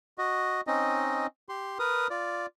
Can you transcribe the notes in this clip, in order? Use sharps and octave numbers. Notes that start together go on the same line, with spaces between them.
F#4 D#5
C4 C#4 D#4 D#5
G4 C6
A#4 B4 D#6
F4 D5